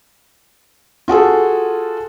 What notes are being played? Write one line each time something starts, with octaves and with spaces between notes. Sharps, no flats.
F4 F#4 G#4 A4